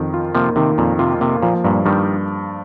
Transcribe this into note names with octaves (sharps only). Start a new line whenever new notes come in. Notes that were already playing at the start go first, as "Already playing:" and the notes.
Already playing: F2 D#3
F4
C3 F3 A#3
C3 D#3
F2 A#2
C3 F4
C3 A#3
A#2 F3
G2 A#2
G2 D#3 G3